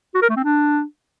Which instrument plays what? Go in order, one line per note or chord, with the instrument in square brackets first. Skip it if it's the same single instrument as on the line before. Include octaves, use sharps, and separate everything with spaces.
[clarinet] F#4
A#4
A3
C4
D4